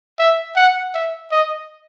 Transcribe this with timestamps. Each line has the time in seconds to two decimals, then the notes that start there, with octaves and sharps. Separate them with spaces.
0.19 E5
0.56 F#5
0.94 E5
1.32 D#5